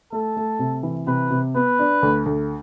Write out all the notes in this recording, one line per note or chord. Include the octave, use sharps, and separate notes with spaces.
A3 A4
A3
C3
E3
C3 B4
C3
B3 B4
D4
D2
D2